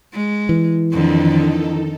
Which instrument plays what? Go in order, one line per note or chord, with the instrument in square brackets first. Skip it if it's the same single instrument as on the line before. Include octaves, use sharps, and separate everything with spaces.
[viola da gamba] G#3
[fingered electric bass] E3
[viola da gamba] F2 D3 [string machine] D#3 D#4 A4